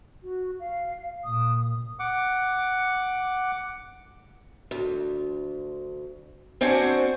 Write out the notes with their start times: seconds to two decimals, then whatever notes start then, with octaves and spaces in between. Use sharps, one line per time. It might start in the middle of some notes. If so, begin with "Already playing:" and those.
0.23 F#4
0.60 F5
1.24 A#2 D#6
1.99 F#5 D6
4.71 D2
6.61 C4 D4 F#4 C5 G#5